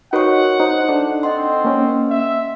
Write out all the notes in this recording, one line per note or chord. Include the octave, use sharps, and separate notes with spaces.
D#4 F#4 A#4 B4 C#5 F#5 C#6
D#4 C5
D4 D#4 A4
C4 D#5 F#5 C6
A#3 C#4
E5